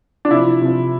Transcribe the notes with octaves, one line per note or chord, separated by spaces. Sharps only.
D4
C3 F3 E4
C3 F3